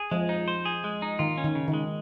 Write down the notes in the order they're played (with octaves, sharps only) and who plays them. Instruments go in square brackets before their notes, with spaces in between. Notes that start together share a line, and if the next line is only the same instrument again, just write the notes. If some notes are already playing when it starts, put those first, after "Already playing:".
Already playing: [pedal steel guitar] G#4
[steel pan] F3 [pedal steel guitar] G#3
[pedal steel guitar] D#4
C5
G#4
G#3
D#4
[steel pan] D#3 [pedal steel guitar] F4
[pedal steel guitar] C#4
[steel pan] D#3
[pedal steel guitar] C#3
[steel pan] D#3
[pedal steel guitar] G#3